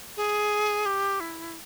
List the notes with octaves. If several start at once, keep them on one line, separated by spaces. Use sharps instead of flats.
G#4
G4
E4